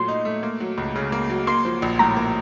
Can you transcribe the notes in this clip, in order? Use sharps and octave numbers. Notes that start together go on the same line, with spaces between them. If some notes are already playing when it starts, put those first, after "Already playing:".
Already playing: A#2 F#3 A3 C6
D#4
A3
A#3
F#3
C#2
C#3
A#3
F#3
A#3 C6
F3
A#1
A2 A#5
A#3